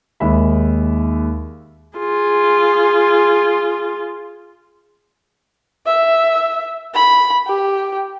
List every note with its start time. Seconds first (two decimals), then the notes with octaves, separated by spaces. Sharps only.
0.20 D#2 G#3 E5 B5
1.98 F4 G#4
5.87 E5
6.94 B5
7.47 G4